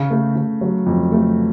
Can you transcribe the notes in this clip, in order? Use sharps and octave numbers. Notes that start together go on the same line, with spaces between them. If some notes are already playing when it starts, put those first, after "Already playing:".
Already playing: C#3
A3
C#3
F#3
F2
A3